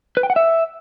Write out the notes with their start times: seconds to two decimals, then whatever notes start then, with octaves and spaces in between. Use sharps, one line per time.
0.17 B4
0.23 G5
0.30 F#5
0.36 E5